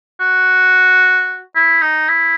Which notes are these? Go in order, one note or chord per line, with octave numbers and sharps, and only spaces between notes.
F#4
E4
D#4
E4